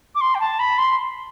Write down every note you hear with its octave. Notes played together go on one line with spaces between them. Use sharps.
D6
C6
G5
A5
B5
C6